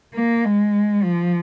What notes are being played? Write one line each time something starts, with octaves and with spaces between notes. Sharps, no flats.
A#3
G#3
F3